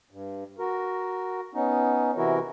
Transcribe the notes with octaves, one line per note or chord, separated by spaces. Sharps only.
G2
F#4 A#4
B3 C#4 D#4
C3 E3 E4 F#4 A#4